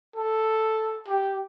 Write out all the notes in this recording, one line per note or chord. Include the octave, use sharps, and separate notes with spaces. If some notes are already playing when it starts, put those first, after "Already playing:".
A4
G4